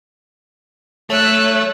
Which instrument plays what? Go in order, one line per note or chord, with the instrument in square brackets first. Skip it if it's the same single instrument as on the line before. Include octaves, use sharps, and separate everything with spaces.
[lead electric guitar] A3 [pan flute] C#5 [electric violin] E6 F#6